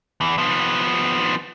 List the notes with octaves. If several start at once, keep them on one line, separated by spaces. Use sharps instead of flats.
E2
F3 B3